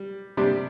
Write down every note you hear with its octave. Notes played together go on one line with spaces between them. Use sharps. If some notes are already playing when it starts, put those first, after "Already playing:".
Already playing: G3
C3 G3 D4 G4